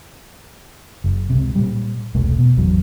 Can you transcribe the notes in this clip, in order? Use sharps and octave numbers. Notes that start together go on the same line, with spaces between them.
F#1
C#2 C3
A#2 G3
E1 C2 A3
B2
G#1 E2 F#3